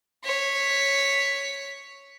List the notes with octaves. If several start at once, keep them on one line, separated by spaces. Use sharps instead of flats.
C#5 B6